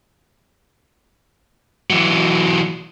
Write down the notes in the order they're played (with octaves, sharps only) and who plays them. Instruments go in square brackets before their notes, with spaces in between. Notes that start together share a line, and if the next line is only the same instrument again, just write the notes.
[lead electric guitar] E3 F#3